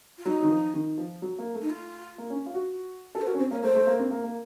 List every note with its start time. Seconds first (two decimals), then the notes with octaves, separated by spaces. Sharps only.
0.18 F4
0.25 F#3 D#4
0.42 D#3
0.50 F3
0.74 D#3
0.98 F3
1.22 F#3
1.39 A#3
1.55 A3
1.62 D#4
1.70 F4
2.18 A#3
2.30 C#4
2.46 F4
2.54 F#4
3.15 F4 A4
3.21 C5
3.26 F#4 A#4
3.34 C#4
3.39 C4 C5
3.51 A#3 C#5
3.63 A3 C5
3.75 A3
3.87 A#3
3.99 C4
4.11 A#3
4.24 A#3